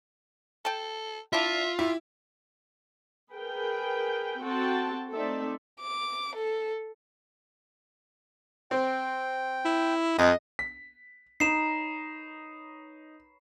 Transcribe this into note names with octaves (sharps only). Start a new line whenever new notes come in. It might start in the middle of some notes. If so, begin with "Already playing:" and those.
A4 G5 A5
D4 E4 F4 E5
E4 G4 E5
G#4 A#4 B4 G5
C4 F#4 A4 G5 A5
A3 C4 D#4 A4 D5 E5
D6
A4
C4 G5
E4
F2 D#5
B6
D#4 B4 C#5 A#5 C7 E7